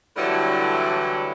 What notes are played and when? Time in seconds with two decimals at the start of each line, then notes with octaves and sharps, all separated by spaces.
0.16 A2 D3 E3 F#3 G3